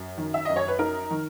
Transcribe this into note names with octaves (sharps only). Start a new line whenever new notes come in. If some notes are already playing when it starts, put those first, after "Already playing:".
Already playing: F#2
D#3
E5
F#2 D#5
C#5
B4
D#4 A#4
D#3